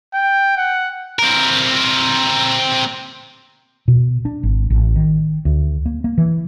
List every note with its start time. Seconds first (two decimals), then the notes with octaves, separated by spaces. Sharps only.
0.14 G5
0.57 F#5
1.19 C4 A#4
3.88 B2
4.25 D4
4.43 G#1
4.70 A1
4.96 D#3
5.45 D2
5.86 A#3
6.04 A#3
6.18 E3